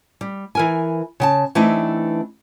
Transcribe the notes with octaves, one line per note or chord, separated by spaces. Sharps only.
G3
E3 A#4 G#5
C#3 F#5 A5
E3 A3 C4 D4 D#4